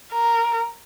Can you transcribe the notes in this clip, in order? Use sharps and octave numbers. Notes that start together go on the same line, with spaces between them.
A#4